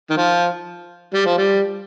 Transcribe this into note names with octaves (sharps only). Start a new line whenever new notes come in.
D#3
F3
G3
F3
G3